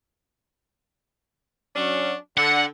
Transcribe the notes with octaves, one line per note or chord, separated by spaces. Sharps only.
F#3 C#4 D4
D3 F#5